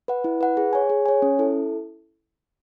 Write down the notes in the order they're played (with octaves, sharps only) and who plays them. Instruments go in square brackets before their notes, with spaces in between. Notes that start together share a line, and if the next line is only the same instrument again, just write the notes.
[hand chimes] B4 F#5
E4
B4 F#5
G#4
C#5 G#5
G#4
C#5 G#5
C#4
E4 A4